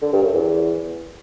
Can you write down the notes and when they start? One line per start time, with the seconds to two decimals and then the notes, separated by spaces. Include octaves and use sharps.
0.02 D3
0.12 G2
0.23 F#2
0.34 E2